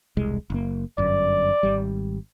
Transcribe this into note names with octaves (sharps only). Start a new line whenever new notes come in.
E1 C2 G#3
F#1 A#3
G1 F#2 D5
G#1 G3